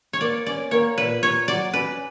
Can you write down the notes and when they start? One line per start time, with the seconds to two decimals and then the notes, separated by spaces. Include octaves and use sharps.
0.13 C#5
0.21 A#3 D5
0.46 C#4 D5
0.71 A#3 C#5
0.97 A#2 B4
1.23 A#2 C#5
1.48 F#3 D5
1.73 C#4 B4